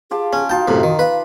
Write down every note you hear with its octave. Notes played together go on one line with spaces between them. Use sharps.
F4 G4 G#4 A5
C#4
D#4 F4 F#4 G5 A5
F#2 A2 C3 F#4
D#3
B4 F5